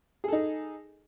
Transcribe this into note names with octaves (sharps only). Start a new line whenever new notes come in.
D#4 G#4 A4